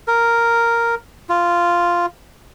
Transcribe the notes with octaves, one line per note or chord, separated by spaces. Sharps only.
A#4
F4